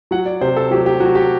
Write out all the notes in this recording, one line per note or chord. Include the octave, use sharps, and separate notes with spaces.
F#3 F#5
D5
C3 C5
A4
F#3 G4
G4
F#3 F#4
G4